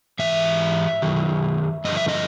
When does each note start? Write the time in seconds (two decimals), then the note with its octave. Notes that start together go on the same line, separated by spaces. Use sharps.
0.19 G#2 E3 E5
1.02 F#2 D#3 F#3
1.85 G2 D3 F3 D#5
1.97 E5
2.08 D#5